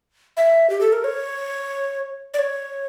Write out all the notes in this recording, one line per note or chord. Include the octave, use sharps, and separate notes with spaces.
E5
G4
A4
A#4
C#5
D5
C#5